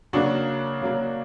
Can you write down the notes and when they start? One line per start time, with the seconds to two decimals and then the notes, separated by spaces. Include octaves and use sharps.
0.13 C#3 F#3 A#3 D4 F#4
0.81 C#3 F#3 A#3